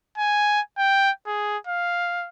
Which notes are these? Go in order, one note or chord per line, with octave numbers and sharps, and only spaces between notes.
G#5
G5
G#4
F5